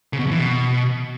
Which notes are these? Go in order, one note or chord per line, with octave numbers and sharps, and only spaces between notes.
C#3
B2
F2
E3
B2